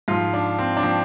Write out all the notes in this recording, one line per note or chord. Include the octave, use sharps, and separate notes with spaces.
G#2 F3 F4
D4
C4
D4
F3 C4